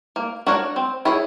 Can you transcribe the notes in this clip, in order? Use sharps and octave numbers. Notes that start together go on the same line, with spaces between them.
A#3
D4 F#4 A#4 C#5
C4
E4 G#4 C#5